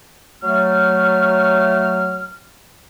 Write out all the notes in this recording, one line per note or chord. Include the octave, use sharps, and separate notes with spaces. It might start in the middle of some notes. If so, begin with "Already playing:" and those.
F#3 A3 F6